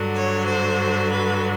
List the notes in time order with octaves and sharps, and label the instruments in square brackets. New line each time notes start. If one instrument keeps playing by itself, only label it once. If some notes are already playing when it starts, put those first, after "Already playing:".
Already playing: [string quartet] G2 D3 F#3
C#5
C5
B4